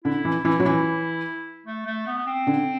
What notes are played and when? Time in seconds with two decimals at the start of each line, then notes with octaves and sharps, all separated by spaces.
0.04 D3 E4
0.25 E3
0.45 E3
0.60 F#3
0.65 E3
1.66 A3
1.86 A3
2.07 B3
2.18 B3
2.27 C4
2.47 D3